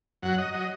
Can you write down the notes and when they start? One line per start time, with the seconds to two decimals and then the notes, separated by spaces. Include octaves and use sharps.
0.22 F#2 F#3 F#5
0.38 D#5
0.54 F#3 D#5